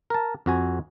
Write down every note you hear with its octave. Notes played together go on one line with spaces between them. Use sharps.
A#4 A5
F2 F#4 G#5